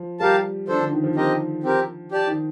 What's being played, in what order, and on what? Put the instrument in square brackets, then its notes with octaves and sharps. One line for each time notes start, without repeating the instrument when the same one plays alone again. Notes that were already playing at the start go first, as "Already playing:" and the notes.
Already playing: [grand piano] F3
[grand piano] G3 [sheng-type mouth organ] G4 A#4 F5 A5
[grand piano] F3 [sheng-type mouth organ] D4 A4 C5
[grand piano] D3
D#3
F3
[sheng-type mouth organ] C4 G4 A#4 D#5
C4 G4 A#4
G4 D5 A5
[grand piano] D#3